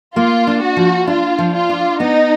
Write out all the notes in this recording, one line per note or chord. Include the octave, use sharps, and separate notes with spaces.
A#3 F4
D4
F#4
F3
D4 F4
F3
F4
D4
B3 D#4